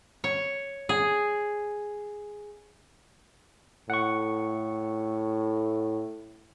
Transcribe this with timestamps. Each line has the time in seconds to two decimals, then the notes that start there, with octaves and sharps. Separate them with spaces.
0.24 C#5
0.89 G#4
3.90 A2 F#5 C#6